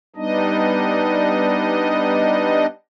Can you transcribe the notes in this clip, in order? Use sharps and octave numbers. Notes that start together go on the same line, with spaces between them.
G3 B3 D4 D#4 D#5